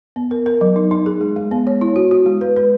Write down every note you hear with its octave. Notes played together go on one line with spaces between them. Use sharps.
B3
A#4
A#4
F#3
D#4
D#4
G#4
G#3
G#3
B3
C#5
E4
F#4
F#4
G#3
B4
B4